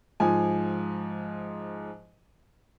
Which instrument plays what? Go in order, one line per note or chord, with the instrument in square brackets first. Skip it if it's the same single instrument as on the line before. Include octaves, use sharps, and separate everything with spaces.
[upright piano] G#2 F3 G#5